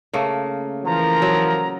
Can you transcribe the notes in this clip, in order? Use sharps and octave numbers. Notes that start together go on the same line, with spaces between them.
C#3 A3 A#3
E3 F3 A#4 A#5
F#3